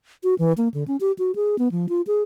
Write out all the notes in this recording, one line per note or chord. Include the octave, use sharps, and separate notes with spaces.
F#4
E3
A#3
D3
C#4
G4
F#4
G#4
B3
F3
F4
G#4